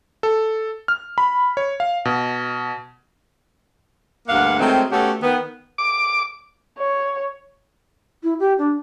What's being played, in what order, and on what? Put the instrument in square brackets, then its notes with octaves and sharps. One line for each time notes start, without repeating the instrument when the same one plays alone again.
[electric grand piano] A4
F6
B5
C#5
F5
B2
[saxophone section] D2 G2 A#3 F5 F#5
D#3 F#3 G#3 A3 C4
A3 B3 C#4 F#4 G4 A4
D#3 B3
[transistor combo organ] D6
[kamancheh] C#5
[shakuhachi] E4
G4
D4